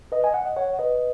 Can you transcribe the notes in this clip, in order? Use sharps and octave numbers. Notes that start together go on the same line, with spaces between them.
B4 D#5
D#5 G#5
F#5
D#5
C#5 F#5
B4 D#5